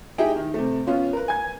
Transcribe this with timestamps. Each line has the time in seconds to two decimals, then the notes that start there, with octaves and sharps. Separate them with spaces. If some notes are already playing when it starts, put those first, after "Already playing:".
0.18 D#4 E4 G4 G#4 E5 G5
0.36 D#3
0.54 C3 A3
0.87 B3 C#4 F4
1.13 A#4 B4
1.28 G#5 G#6